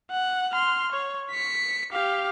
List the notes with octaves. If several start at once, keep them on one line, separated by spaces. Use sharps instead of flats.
F#5
C6 F6
C#5
B6 C#7
G4 F5